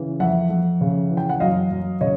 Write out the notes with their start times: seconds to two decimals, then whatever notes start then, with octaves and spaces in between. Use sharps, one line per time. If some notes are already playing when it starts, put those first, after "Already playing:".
Already playing: C#3 E3
0.20 F2 E5 F#5
0.50 F2
0.81 C#3
1.10 E3
1.17 G5
1.29 F#5
1.40 F#2 D#5 F5
1.71 F#2
2.01 C#3 C#5 D#5